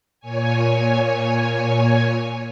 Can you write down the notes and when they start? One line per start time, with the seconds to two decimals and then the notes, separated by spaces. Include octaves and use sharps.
0.20 A#2 C#5 G#5